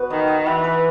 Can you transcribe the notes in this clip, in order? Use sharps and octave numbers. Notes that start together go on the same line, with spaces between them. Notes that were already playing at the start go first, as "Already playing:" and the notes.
Already playing: B3 F#4 B4
D#3 D#4
D#5
E3 F#4
B4